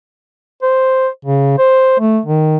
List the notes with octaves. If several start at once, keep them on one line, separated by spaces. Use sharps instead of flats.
C5
C#3
C5
A3
D#3